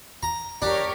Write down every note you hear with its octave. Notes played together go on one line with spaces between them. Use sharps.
A#5
D4 G4 A#4 C#5